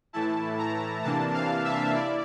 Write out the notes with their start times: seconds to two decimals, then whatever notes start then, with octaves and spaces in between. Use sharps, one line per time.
0.13 A2 E3 A3 E4 A5
0.58 A#5
1.04 C3 E3 A#3 D4 A5
1.34 F5
1.64 E5
1.94 E4 D5